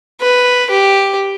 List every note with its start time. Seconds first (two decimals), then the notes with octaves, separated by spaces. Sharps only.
0.21 B4
0.70 G4